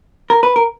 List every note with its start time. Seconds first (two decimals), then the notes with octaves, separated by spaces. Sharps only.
0.30 A#4
0.43 B4
0.56 A#4